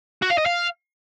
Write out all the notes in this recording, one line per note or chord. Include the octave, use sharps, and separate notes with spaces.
F#4
F5
D#5
F5